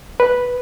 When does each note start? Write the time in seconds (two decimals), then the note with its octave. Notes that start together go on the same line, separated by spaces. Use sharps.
0.20 B4